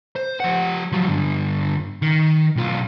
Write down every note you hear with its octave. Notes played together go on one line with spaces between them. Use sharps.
C5
F3 F#5
F3 F#3
G2 D3
D#3
B1 F4